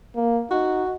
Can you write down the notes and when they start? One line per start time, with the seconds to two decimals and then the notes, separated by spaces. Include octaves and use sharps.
0.16 A#3
0.51 D#4 F#4